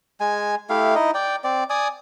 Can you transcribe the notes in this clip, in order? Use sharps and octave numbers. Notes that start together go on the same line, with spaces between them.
G#3 G#5
A3 E4 G4 F5
D#4 E4 D#5
D5 G5
C4 D5
D5 G#5 D#6